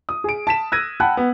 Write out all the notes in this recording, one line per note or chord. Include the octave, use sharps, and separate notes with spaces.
D#6
G#4 D7
A5 B6 E7
E6 F#6 G#6 A#6 D#7
F#5 G5 A5 B5 F#6
B3